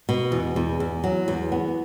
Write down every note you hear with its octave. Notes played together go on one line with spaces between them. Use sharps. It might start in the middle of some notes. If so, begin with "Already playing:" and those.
B2
E2
E2
E2
F#3
E2
B3